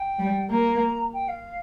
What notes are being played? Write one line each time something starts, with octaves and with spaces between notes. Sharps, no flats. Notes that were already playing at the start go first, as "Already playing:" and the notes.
Already playing: G5
G3
A#3 A#5
G5
F5